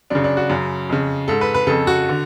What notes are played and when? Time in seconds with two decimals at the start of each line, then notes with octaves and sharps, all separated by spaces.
0.10 F#2 C#3 D4
0.24 D4
0.37 F#4
0.50 F#2 C#3
0.90 F2 C#3
1.28 G#2 A4
1.41 B4
1.54 B4
1.67 F2 C#3 A4
1.87 F#4
2.09 D3